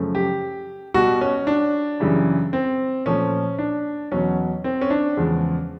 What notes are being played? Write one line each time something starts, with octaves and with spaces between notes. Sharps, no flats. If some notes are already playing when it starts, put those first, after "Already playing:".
Already playing: F#2 C#3 F3 A3
G4
B2 G3 F#4
C#4
D4
F#2 C#3 E3 G3
C4
A#2 F3 A3 C#4
D4
E2 B2 F#3 C#4
C4
C#4
D4
E2 C#3 F3 G#3